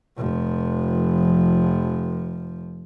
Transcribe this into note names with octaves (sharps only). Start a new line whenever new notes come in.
F1 F3